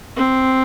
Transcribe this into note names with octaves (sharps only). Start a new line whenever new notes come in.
C4